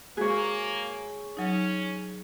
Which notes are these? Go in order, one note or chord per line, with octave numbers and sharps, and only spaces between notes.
G#3 A#3 F#4 G#4 C#5
F#3 C#4 D#4